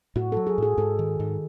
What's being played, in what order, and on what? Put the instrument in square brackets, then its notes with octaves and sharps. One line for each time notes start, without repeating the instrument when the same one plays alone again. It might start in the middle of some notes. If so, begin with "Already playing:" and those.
[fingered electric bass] A2 [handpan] F#4
[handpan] A4
[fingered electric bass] F#3
[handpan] G#4
[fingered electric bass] A2 [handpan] G#4
[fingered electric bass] G#2 [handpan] A4
[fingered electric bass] D#3
G#2